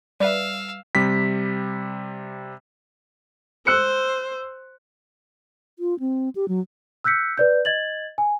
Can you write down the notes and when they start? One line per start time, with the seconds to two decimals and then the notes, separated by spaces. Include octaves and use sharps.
0.20 G3 B4 D5 E5 F5 E6
0.95 C3 G3 B6
3.67 C5 E6 F#6 C#7
5.79 F4
6.00 C4
6.36 G4
6.48 F#3
7.04 E6 F#6 G6 B6 C#7
7.37 B4 D5 G6
7.65 D#5 G#6 A6 F#7
8.18 G#5